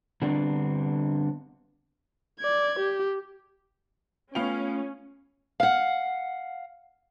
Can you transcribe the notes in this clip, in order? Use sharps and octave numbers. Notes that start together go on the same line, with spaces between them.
D3 G3 B3 C4 D4
D5 G#6
G4
A3 B3 C#4 F4 F5 G5 F7
F5 F#5